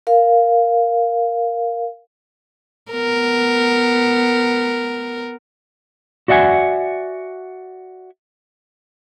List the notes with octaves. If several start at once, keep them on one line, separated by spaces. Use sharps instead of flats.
A#4 F5
B3 A#4
F#4 D5 E5 F#5 G#5